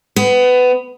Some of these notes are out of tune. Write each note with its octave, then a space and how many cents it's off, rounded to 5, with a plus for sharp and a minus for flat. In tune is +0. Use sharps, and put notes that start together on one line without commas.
B3 +20